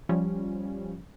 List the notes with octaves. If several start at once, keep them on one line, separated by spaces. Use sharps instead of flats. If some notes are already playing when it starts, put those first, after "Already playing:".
F3 G3 C#4